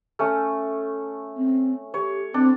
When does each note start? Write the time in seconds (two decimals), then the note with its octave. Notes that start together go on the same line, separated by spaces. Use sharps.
0.19 A3 C#4
1.37 C4
1.94 G4 C#5
2.34 C4 D4